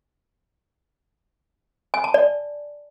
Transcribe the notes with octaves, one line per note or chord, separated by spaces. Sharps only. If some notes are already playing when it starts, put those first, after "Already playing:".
G#5
A5
D5